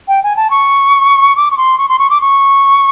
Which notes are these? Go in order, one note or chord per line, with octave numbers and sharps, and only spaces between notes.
G5
G#5
A5
C#6
D6
C#6
C6
C#6
C6
C#6
D6
C#6